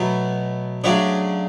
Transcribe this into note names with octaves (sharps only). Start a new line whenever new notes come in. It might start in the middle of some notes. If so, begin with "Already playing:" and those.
Already playing: B2 F#3 A3
C#3 F#3 A3 D4 C#5